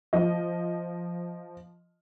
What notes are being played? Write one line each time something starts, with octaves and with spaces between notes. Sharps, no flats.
F3 D#5